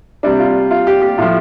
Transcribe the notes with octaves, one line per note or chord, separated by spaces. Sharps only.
C3 G3 D4
F4
F4
G4
G4
A2 F3 F4